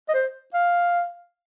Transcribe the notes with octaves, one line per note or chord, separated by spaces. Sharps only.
D#5
C5
F5